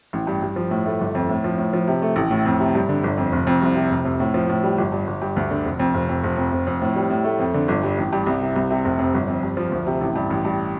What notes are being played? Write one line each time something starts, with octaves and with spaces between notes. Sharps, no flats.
A1
G2
G2
F3
A2
A3
G1
F2
A2
F3
A2
F3
C3
A3
A1
A2
F2
C3
G2
D3
G1
F2
F1
F2
C2
C3
F1
F2
A2
F3
A2
G3
G1
G2
G1
G2
D2
D3
F1
F2
F1
F2
F1
F2
F1
F2
A2
G3
A2
A3
F2
D3
G1
G2
A1
G2
C2
C3
C2
C3
F1
F2
G1
F2
G2
F3
D2
C3
A1
G2
A1
G2